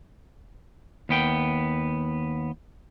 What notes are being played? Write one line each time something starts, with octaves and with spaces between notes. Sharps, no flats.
D#2 B3 G5